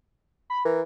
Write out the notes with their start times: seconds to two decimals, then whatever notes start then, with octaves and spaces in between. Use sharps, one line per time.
0.50 B5
0.65 E3 A#4